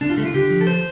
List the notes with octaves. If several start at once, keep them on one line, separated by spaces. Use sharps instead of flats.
D3 D4
F4
D3 A3
F4
D3 G4
F3
A4
C5